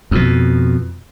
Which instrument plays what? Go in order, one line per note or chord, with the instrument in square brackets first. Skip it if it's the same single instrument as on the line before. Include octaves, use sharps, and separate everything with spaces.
[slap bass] F2 B2